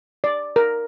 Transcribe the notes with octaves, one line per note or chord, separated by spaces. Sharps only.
D5
A#4